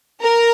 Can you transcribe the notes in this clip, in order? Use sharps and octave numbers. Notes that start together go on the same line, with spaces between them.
A#4